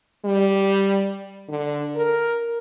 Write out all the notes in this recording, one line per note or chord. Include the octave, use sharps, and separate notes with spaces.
G3
D3
A#4